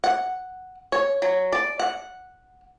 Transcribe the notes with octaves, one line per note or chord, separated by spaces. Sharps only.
F#5
C#5
F#3
D5
F#5